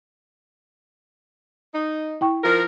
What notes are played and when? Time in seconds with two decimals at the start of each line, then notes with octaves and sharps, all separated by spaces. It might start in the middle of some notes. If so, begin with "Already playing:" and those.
1.74 D#4
2.21 E4 G5 C#6
2.44 F3 A#4